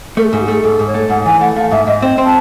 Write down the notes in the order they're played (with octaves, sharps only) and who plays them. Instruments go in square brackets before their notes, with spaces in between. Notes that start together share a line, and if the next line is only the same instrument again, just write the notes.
[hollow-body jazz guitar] A3 [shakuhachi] A#4
[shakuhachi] G#4
A4
[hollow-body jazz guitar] G#2
[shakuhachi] G4
[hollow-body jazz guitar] A3 [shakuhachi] G#4 A4
[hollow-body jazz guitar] G#2 [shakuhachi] A4
[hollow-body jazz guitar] G#2
[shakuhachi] C#5
[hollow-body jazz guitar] A3
[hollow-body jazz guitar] G#2 [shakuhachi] F#5
[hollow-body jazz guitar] E3 [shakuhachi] G#5
[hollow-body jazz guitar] A3 [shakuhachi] F#5
[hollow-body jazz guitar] A3 [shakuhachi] F5
[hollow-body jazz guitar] G#2 [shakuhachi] E5
[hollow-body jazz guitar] G#2 [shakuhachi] D#5
[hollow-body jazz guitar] C4
C4
[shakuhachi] A5